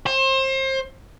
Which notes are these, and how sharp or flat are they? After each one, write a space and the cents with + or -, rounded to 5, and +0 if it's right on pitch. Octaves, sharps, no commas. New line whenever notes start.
C5 +30